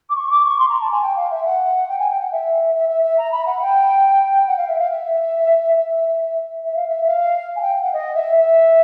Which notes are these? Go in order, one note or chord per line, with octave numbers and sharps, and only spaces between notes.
D6
C#6
D6
C#6
C6
A#5
A5
G#5
G5
F5
E5
F#5
G5
G#5
G5
F#5
E5
E5
E5
E5
A#5
B5
F#5
G5
F#5
F5
E5
F5
E5
E5
E5
F5
E5
F5
G#5
G5
F#5
D#5
E5
E5